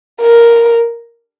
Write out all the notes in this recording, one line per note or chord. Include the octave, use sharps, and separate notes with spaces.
A#4